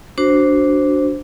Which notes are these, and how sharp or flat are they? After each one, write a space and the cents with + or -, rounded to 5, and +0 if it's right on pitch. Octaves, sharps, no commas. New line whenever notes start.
D4 -10 F#4 +0 C5 +0